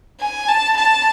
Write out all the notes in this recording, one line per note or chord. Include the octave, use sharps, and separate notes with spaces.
G#5
A5
A5